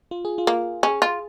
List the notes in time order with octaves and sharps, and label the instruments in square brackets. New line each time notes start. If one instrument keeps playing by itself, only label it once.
[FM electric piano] F4
G#4
F4
[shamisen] A#3
[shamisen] C#4 [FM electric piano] G#4
[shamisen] F4